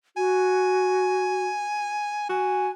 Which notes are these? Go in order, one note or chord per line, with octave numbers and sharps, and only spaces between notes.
F#4 G#5
F#4 G#5